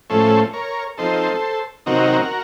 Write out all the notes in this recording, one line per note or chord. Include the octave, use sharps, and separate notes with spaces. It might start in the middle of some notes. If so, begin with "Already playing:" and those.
A2 F3 A3 C#4 A4 C5
A#4 C#5
F3 C4 D#4 A4 C5
C3 D#3 F#3 C4 D#4 F#4 A#4